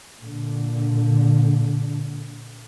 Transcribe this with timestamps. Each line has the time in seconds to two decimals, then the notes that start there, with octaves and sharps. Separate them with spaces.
0.19 A#2 D3